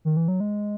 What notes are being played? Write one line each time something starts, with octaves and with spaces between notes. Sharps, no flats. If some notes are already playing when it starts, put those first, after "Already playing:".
D#3
E3
F#3
G#3